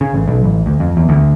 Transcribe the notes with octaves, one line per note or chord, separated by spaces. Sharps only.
C#3
A1
B1
A1
D2
F2
E2
D2